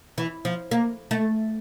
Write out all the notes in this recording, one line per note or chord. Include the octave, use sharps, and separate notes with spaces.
E3
F3
A#3
A3